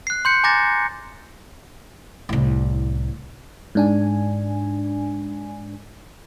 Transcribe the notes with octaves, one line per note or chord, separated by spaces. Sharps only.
F#6 C7
C6 G6 C#7
G#5 A#5 D6 G6 A6 A#6
C2 A2
G#2 D4 G#5